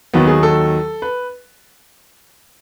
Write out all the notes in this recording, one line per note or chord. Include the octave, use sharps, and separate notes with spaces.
D#2 D#3 F#3 B3
G#4
A4
B4